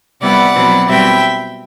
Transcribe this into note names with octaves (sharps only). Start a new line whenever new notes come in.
C3 G3 B3 E4 D5 F#5
B2 F#3 C4 E4
B2 G3 C4 E4 E5 G5